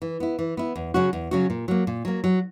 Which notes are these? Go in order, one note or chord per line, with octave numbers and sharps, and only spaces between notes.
E3
B3 E4
E3
B3 E4
E2
C#3 F#3 C#4 F#4
E2
C#3 F#3 C#4 F#4
A#2
F#3 A#3
A#2
F#3 A#3
F#3